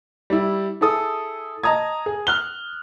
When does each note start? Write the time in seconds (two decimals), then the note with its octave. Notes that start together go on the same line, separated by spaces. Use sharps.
0.30 G3 E4
0.81 E4 G#4 A4 D#6
1.63 D#5 A5 A#5 D#6 G#6
2.06 G#4
2.27 F6 F#6 G7